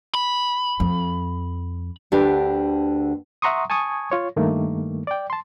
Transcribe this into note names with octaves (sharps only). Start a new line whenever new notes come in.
B5
F2
D2 D3 D4 G4 B4
E5 F#5 A#5 C6 C#6 D#6
G#5 A5 C#6 D#6 G#6
F4 C#5
G2 D#3 A3 A#3
D5 G5
A5 C6